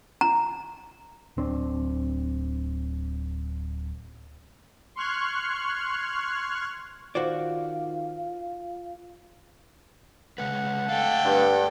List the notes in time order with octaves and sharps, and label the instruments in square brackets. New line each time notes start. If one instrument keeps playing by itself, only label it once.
[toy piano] A#5
[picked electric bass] D1 C4 D4
[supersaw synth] C6 C#6 F6 F#6 G#6
[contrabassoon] D#3 [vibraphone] F4 [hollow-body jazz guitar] F#4 C5 D5 [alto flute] F5
[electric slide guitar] C#3 G#3 B4 [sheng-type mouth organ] F#5
[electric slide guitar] A3 D#5 F5 [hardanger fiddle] A4 G5
[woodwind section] G2